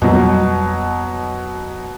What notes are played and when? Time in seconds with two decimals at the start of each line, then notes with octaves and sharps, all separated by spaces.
0.02 F2 B2 F#3 G3 A#3